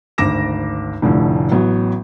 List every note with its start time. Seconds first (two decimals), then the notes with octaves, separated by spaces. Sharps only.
0.18 G#1 D2 D6 A#6 E7
1.02 F1 A2 D3 F3
1.52 A1 F#3 B3